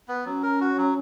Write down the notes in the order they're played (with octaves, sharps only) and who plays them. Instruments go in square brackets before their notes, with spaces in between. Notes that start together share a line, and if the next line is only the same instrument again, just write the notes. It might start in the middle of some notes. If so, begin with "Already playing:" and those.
[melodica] B3
[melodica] F#3 [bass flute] C#4
[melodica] A#4
F#4
F#3